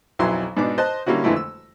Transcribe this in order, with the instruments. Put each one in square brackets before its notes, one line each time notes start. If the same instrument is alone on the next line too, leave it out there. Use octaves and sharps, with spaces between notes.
[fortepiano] B1 F2 F#3 E4 G#5 C6
G#2 B2 D4 D#4 D6
C5 D#5 A5 F#6
D3 G3 A#3 C#4 E4 F#4
F2 D3 E3 G#3 A3 E4
E6